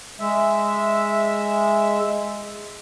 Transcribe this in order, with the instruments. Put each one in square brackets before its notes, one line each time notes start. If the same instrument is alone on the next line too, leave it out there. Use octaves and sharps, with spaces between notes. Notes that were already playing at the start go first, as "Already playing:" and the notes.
[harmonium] G#3 E5